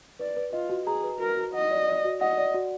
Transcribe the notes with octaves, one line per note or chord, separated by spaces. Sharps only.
B4 D5
B4
F4 D#5
F#4
G#4 A#5
B4
F#4 A#4
F#4
D#5 F#5
D5
D5
F#4
D#5 F#5
D5
F#4